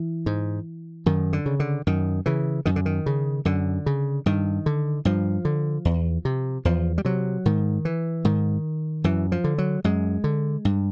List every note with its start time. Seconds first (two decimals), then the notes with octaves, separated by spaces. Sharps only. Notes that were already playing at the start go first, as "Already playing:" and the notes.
Already playing: E3
0.26 G#2
1.06 F#2 D#3
1.33 D3
1.46 C#3
1.60 D3
1.87 F#2 D#3
2.26 C#3 E3
2.65 F#2 D#3
2.76 D3
2.86 D#3
3.06 C#3
3.45 F#2 D3
3.86 C#3
4.26 G2 D#3
4.66 D3
5.05 G2 F3
5.45 D3
5.85 E2
6.25 C3
6.65 E2 F3
6.98 G3
7.05 C3 F#3
7.46 G#2 D#3
7.85 E3
8.25 G#2 D#3
9.04 F#2 E3
9.32 F3
9.44 D3
9.58 F#3
9.84 F#2 G#3
10.24 D3
10.65 G2